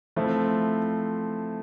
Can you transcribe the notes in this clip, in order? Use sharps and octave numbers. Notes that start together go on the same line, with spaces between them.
F3 A3 C4 E4